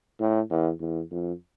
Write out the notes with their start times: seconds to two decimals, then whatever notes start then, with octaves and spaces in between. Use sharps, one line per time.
0.20 A2
0.50 E2
0.80 E2
1.11 F2